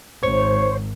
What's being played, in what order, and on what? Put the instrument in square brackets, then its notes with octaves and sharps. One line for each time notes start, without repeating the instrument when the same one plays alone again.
[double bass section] G#1 [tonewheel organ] C5 [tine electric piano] C#5 C#6